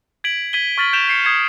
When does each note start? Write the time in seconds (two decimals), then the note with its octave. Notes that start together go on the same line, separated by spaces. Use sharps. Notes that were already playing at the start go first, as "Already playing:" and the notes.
0.24 G#6 B6 D7 F#7
0.53 G#6 B6 D#7 F#7 G7
0.78 C#6 F6 A6 B6 F#7
0.93 G6 B6 D7 E7 F7 G7
1.08 G6 C7 C#7
1.24 D#6 G#6 C7 C#7 E7